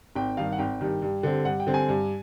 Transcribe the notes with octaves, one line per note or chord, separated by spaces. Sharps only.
G#1 G5
G2 D#3 G3 F5
F#5
G#1 G5
G2 D#3 G3
G2
D3 G3 C4
G2 F#5
G5
D3 G3 C4
G#5
G2